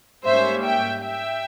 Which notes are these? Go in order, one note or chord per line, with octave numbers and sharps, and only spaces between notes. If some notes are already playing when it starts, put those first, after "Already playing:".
G#2 G3 A#3 C#4 C5 E5
E5 G5
E5 G5